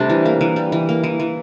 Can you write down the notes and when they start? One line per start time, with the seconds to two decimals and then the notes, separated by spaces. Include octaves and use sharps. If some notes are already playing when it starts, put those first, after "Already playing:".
Already playing: C3 G3 A3 D4
0.10 E3
0.26 A#3
0.41 E3
0.56 G3
0.72 E3
0.89 A#3
1.04 E3
1.20 E3